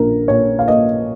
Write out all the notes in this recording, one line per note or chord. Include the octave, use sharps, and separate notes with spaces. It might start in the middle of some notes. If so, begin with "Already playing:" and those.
Already playing: A#1 A#4
A#2 C#5
F5
A#3 D#5